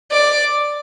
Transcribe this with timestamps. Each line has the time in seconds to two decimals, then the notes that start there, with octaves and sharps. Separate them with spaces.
0.12 D5